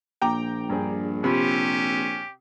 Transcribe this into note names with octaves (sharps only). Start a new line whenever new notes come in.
A#1 A#2 G5 A#5 D6
G2 G#4
C3 C#4 F4 G4 B5 C6